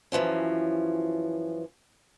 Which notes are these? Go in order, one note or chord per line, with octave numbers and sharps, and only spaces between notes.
F#2 E3 F3 C#4